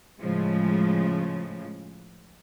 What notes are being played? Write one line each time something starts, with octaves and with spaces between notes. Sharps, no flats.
A2 C#3 F3 G#3